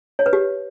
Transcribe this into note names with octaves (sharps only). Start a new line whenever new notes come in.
C#5
B4
G4